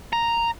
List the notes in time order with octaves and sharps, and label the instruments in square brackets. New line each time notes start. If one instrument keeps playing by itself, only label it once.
[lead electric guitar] A#5